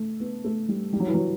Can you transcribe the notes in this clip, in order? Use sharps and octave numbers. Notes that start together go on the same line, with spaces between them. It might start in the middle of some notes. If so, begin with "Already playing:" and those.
Already playing: A3
B3
A3
G3
G3
F#3
E3
F#3